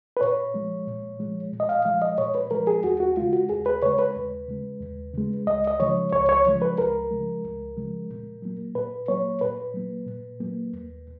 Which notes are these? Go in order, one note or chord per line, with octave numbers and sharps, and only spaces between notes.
B4
A#2 C#5
F3 G#3
A#2
F3 G#3
A#2
D#5
F5
F3 G#3 F5
D#5
A#2 C#5
B4
F3 G#3 A#4
G#4
D#2 F#4
F#4
C#3 G#3 F4
F#4
D#2 G#4
B4
C#3 G#3 C#5
B4
D#2
C#3 G#3
D#2
C#3 G#3
C#2 D#5
D#5
C#3 F3 G#3 C#5
C#2 C#5
C#5
C#3 F3 G#3
B4
C#2 A#4
C#3 F3 G#3
C#2
C#3 F3 G#3
A#2
F#3 A#3
A#2 B4
F#3 A#3 C#5
A#2 B4
F#3 A#3
A#2
F#3 A#3
D#2